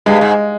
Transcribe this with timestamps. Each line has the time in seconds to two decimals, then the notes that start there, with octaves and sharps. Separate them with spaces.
0.06 G2 G#3
0.21 G#2